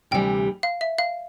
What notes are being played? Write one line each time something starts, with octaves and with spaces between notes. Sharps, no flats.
D2 C3 E3 G3 G5
F5
E5
F5